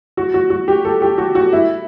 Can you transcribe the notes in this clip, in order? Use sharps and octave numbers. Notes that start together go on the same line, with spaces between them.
F#4
F#4
F#4
G4
A4
G4
F#4
F#4
E4